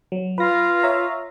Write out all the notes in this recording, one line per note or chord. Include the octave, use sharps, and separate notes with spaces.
F#3
F4 B4 A#6
C#5 E5 A#5